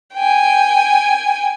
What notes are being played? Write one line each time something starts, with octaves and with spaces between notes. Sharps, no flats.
G5 G#5